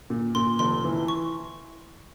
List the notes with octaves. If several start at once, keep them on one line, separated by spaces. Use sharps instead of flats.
A#2
A#2 C6
F1 C6
E3
C#6